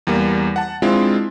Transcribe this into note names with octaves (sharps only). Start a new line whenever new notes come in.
E2 G3 A#3
F#5 A5
G#3 C4 D4 E4 F4